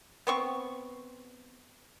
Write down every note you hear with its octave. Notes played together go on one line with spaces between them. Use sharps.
B3 C4 C#6